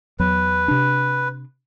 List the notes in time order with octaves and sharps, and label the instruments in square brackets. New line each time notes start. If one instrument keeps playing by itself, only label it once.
[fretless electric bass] E2 F#3 [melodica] B4
[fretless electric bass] C3 D4